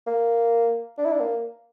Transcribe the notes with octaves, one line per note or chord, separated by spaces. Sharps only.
A#3
D4
E4
D4
A#3